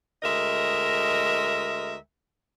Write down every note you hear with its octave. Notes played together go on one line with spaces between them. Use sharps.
D2 G#3 A#4 D#5 E5